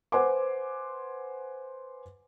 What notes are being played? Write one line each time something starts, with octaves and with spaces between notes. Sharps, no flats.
B4 C5 F#5 G#5 C6 D6